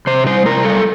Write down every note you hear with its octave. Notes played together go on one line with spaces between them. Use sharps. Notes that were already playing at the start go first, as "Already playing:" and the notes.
C3 C5
G3 C5
C3 A#4
G3 A4